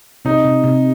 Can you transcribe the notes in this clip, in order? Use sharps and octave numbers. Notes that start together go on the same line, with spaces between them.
C3 D#4
C3
C3